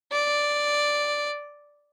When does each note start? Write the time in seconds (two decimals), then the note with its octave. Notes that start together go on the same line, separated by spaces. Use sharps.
0.12 D5